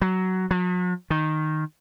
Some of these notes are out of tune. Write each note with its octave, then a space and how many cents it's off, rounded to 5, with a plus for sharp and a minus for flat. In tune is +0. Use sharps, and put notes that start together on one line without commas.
F#3 +10
F#3 -45
D#3 -5